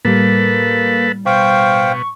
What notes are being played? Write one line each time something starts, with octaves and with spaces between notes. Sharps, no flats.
A2 G3 A#3 A4 B4
B2 C5 F5 G5 C#6